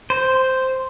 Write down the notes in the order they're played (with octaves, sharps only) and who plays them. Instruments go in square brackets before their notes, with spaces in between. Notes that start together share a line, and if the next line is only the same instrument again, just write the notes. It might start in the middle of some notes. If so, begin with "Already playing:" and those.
[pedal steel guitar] C5